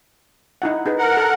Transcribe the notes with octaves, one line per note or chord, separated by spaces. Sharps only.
D#4 E4 F#5
D#4 G#4 B4
A#4 F#5
A4